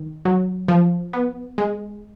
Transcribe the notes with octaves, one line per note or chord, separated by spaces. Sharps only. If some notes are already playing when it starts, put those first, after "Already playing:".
Already playing: D#3
F#3
F3
B3
G#3